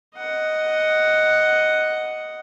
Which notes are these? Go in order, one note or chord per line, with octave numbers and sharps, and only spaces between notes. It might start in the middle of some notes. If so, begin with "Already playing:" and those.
D#5 F#5